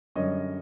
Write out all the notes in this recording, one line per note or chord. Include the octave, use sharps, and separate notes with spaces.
F#2 D3 G3 C#5 D#5